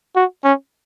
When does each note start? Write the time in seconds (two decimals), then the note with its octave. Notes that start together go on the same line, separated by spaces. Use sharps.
0.16 F#4
0.44 C#4